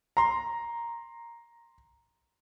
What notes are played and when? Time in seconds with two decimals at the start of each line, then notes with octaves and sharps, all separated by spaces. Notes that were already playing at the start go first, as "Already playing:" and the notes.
0.17 A#5 C6